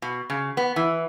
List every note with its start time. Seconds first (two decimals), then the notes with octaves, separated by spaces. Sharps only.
0.02 B2
0.30 C#3
0.57 B3
0.76 E3